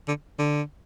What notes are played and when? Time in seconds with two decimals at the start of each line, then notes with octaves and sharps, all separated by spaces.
0.08 D3
0.39 D3